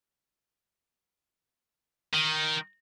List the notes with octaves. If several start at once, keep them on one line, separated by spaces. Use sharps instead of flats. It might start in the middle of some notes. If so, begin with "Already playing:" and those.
D#3